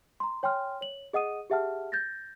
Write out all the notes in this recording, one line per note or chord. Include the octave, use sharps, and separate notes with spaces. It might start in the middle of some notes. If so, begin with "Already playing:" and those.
A#5 C6
C#5 G5 G#5 C6 F6
C#5 F#7
G#4 D#5 F#5 D#6 D#7
G4 G#4 E5 F#5 A5 F6
G6 A6 A#6